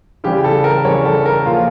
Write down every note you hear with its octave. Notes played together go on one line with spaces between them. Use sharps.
C#3 E3 G3 G4
A4
A#4
C#3 E3 G3 C#5
A4
A#4
A#2 F3 F4